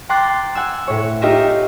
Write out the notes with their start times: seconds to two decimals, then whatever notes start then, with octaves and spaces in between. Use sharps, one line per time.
0.09 G5 A#5 C6 D6 F#6 A6
0.55 F#5 G#5 E6
0.87 A2 C#5
1.22 D#4 F4 G4 A#4 D#5 E5